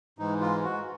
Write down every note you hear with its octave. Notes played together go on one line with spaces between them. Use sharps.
G#2 E3 G#3 D#4
F4
F#4